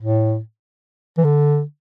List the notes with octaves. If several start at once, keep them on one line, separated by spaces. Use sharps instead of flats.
A2
E3
D3